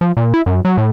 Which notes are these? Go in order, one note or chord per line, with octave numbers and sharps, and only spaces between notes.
F3
A#2
E4
F#2
F#3
A2